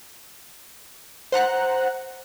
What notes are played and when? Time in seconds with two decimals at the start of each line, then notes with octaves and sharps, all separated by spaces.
1.32 C5 F#5 A#5 F#6